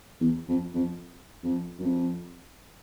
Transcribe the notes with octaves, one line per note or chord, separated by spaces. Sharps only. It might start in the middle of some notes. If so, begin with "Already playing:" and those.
E2
F2
F2
F2
F#2
F2